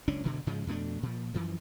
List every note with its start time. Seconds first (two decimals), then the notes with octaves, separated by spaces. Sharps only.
0.08 F#1 C#2 C#4 D4
0.24 F#1 D2 B2 D3
0.46 G#2 C#3 F3 G#3
0.67 F2 B2 A3 D4
1.03 A#2 F3
1.34 F#2 E3 F3